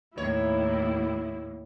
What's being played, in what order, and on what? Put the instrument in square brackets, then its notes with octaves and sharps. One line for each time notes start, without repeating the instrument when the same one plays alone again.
[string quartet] D#2 A2 [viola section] E4 [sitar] C#5